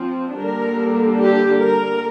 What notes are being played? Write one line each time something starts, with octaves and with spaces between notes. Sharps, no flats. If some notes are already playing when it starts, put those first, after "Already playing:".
Already playing: F3 C4
D3 G3 A#3 D4 A#4
G4
A#4